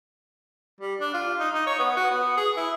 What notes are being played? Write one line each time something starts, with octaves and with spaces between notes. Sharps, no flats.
G3
D4
F4
D#4
D#4
C#5
B3
F#4
B3
G#4
E4